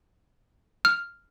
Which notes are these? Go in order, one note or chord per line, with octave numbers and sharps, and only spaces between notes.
F6